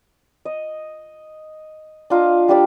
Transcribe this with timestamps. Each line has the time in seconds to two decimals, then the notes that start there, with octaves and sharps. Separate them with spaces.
0.45 D#5
2.10 D4 F4 D#5 A#5
2.48 G3 D4 G4 D5